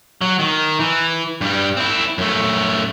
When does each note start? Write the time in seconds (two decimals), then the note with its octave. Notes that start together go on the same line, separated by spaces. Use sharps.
0.21 F#3
0.39 D#3
0.80 E3
1.41 G2 G3
1.77 C4 E4
2.18 F#2 A3